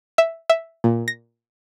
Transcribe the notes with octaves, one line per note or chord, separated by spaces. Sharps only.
E5
E5
A#2
A#6